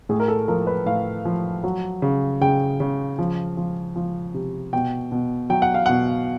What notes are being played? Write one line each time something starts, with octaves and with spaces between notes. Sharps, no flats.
A2 G#4
A#4
A4
F3 A#4
B4
A2 F5
F3
F#3
C#3
C#3 G5
C#3
F3
F3
F3
C3
B2 G5
B2
F#3 G5
F#5
F5
B2 F#5